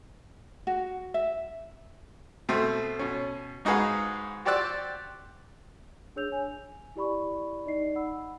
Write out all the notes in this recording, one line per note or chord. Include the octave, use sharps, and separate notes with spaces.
F#4
E5
B2 A3 C4
B2 C#4
G#2 D#4 F#4 G#4 B4 F5
F#4 G4 C5 D5 E6 F#6
D4 G#4 C#5 E6 G6 F7
G#5
E4 G4 D5 B5 C#6
D#4 D5 D#5 C7
F#5 B5 E6